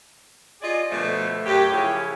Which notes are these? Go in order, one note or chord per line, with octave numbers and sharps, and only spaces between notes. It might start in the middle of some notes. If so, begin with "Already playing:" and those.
F4 G4 G#4 D5 D#5
B2 D3 F3 A3
F#2 F#3 G4
C#3 F3 C#4 E4